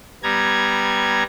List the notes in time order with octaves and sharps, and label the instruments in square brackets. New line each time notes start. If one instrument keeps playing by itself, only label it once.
[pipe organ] G3 B3 A#5 G#6